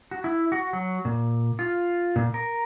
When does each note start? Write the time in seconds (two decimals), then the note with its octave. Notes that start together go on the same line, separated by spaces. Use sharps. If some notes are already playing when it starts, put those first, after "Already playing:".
0.11 F#4
0.24 E4
0.52 F#4
0.73 F#3
1.05 A#2
1.59 F4
2.16 A#2
2.34 A#4